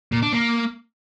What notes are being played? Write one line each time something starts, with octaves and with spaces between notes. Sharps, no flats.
A#2
D4
A#3